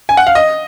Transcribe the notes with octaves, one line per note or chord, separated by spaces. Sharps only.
G#5
F#5
F5
D#5